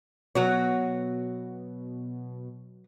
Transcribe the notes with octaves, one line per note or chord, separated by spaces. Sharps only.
B2 F#3 F#4 C#5